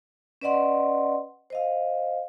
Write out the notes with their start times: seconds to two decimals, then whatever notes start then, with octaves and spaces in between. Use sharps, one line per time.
0.41 C#4 B4 D5 D#5 F#5 C6
1.50 C5 D#5 F5